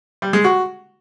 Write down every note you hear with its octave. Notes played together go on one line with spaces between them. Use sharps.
G3
G#3
F#4